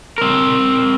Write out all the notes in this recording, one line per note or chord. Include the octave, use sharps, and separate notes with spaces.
C4 A#4